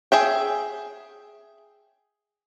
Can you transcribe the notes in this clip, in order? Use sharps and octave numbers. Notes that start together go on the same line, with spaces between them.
G#4 E5 G5